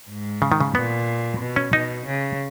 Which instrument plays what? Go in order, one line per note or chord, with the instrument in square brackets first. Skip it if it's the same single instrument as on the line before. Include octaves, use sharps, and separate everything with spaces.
[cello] G#2
[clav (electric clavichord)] C#3
D#3
C#3
[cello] A#2 [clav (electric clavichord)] B3
[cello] B2
[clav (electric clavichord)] C#4
[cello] B2 [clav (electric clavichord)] D#4
[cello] C#3